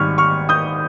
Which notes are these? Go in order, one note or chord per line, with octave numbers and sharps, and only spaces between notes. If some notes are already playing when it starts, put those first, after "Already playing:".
Already playing: G#1 G#2 G3 C#6 F6
C#6 F6
D#6 G6